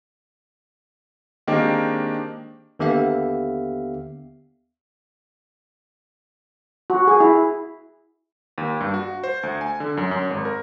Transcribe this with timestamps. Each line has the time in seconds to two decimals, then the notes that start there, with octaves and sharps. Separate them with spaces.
1.47 D#3 G#3 A#3 C4 D4 G4
2.79 D#2 D3 B3 G4 E5 F5
6.90 F#4
7.07 G#4
7.20 E4
8.58 D#2
8.80 G2
8.94 F#4
9.24 C5
9.43 D2
9.61 G#5
9.80 D3
9.97 F#2
10.11 F#2
10.30 G#1
10.45 A#4